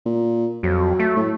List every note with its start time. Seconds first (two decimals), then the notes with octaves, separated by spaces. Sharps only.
0.06 A#2
0.63 F2 F#3
0.99 A3
1.16 A2